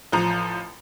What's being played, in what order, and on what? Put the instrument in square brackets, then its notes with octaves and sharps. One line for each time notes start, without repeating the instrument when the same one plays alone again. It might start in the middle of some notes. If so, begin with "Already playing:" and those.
[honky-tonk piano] A1 F3 A#5